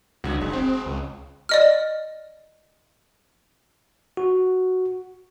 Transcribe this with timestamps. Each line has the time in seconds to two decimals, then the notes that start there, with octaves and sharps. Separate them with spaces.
0.24 C#2 D3 G3 F#4
0.41 F#1 B2 G#3
0.53 C4
0.86 C#2
1.49 D5 D#5 F6
4.17 F#4